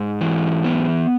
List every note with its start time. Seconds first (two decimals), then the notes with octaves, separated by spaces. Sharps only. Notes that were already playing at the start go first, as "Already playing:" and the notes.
Already playing: G#2
0.21 E3
0.65 B3